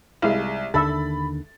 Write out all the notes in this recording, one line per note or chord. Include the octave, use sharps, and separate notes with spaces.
C2 G#3 E4 F5
D#2 D3 D#3 A4 E5 B5 A6